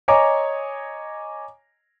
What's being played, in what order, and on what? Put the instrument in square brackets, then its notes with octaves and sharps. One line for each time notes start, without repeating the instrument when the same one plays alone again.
[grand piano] C#5 D#5 G#5 A#5 D6